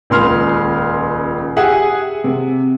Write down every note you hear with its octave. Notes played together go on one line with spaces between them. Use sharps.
D#1 C#2 C6 F6
G4 G#4 E5 F#5 G#5
C3